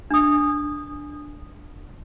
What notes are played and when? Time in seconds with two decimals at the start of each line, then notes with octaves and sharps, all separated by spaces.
0.10 D4 D#6